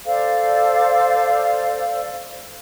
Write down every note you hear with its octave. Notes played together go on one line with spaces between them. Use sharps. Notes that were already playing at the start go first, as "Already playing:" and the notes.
A4 C5 D5 F5